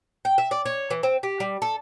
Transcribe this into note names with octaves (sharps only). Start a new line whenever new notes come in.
G5
E5
D5
C#5
E3
C4
G4
G3
A4